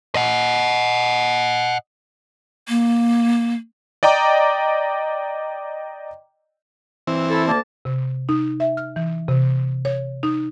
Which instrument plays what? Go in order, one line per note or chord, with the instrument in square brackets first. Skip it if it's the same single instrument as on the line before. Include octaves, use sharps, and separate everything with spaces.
[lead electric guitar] D#5 F#5
[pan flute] A#3
[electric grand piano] D5 D#5 G5 A#5 D6
[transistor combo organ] E3 C4
[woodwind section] E4 A4
D2 A#3 A5
[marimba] C3
D#4
E5
F6
E3
C3
C#5
D#4